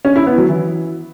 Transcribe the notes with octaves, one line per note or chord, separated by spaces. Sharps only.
C#4
E4
B3
F#3
E3